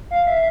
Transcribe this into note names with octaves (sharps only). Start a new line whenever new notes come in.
F5
E5